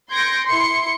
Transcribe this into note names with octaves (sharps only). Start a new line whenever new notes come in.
C6 G6 G#6 A#6 C#7 D7
E4 C6 C#7